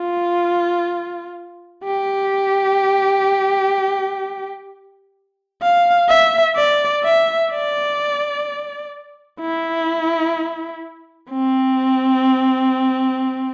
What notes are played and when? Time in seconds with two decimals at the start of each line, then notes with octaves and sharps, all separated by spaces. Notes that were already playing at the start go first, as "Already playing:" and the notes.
Already playing: F4
1.84 G4
5.63 F5
6.09 E5
6.56 D5
7.04 E5
7.51 D5
9.41 E4
11.30 C4